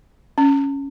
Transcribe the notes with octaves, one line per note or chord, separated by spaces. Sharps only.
C#4